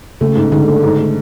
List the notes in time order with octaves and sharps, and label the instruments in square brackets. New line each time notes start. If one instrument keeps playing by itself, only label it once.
[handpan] C#3 [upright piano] A3
[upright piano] G#2
[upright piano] G#2 [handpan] D3
[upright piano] A3
G#2
A3